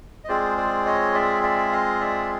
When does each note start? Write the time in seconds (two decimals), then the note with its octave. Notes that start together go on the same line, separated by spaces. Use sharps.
0.24 D#5
0.28 G#3 C4 F4 G#4 C5 D5
0.57 C5 D5
0.86 C#5 D#5
1.14 D5 E5
1.43 D5 E5
1.72 D#5 F5
2.01 D5 E5